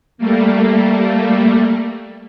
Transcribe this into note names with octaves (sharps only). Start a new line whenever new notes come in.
G3 A3 A#3